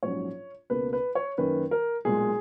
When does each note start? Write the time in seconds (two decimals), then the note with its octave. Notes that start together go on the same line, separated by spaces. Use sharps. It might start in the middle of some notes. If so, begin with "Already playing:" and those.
0.03 A#1 G#2 F#3 C#4 C#5
0.70 C#2 B2 A#3 B4
0.93 B4
1.15 C#5
1.38 F#2 D#3 A#3 C#4 B4
1.71 A#4
2.05 B1 A#2 G#3 G#4